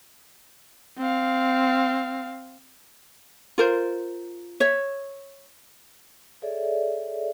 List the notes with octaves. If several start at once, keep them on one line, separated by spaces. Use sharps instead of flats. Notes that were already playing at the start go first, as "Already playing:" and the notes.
C4 F5
F4 A#4 C5
C#5 E5
G#4 A4 C#5 D5 E5